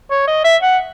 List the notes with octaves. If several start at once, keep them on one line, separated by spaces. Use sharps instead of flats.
C#5
D#5
E5
F#5